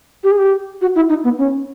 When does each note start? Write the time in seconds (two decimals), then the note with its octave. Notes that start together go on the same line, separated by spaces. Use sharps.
0.24 G4
0.31 G#4
0.38 G4
0.81 F#4
0.96 E4
1.09 D#4
1.24 B3
1.38 C#4